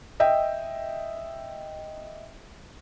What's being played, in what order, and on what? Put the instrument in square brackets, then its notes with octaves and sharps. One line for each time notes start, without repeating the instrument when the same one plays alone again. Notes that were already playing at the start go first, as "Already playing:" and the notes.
[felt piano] D#5 E5 G5